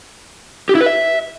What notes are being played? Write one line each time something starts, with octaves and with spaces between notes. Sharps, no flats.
G4
E4
B4
E5